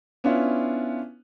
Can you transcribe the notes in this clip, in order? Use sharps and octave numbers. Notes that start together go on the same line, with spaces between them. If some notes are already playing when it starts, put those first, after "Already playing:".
B3 C#4 D4 E4 F4